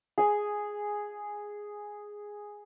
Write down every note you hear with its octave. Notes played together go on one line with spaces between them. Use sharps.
G#4 G#5